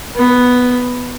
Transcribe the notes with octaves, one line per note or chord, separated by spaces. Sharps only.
B3